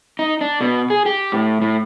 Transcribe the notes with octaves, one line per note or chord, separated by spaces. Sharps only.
D#4
D4
B2
G#4
G4
A2
A2